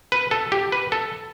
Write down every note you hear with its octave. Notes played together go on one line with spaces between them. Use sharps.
B4
A4
G4
B4
A4